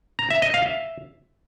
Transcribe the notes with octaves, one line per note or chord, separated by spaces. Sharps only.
A#5
E5
D#5
F5
E5